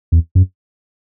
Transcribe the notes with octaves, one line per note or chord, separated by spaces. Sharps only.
E2
F#2